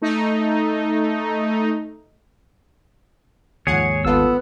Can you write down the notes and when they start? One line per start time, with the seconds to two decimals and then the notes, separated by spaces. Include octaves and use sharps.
0.02 A3 D#4
3.67 D#2 G#2 F3 G#4 C#5 F#5 G#6
4.05 G#1 B3 F4 A4 E6